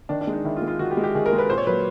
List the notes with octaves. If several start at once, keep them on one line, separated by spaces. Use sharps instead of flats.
D#3 D4
D4
G#3
D#4
D#3 E4
F4
G#3
F4
D#3 F#4
G4
G#3
G4
D#3 G#4
A#4
G#3
B4
A#2 C5
C#5
F#3 A#3 B4